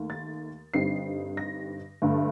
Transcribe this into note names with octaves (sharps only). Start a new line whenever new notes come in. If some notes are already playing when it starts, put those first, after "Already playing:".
Already playing: D#2 D#3 A3
A6
G2 D3 G3 C4 D#4 C7
A#6
G2 D3 A3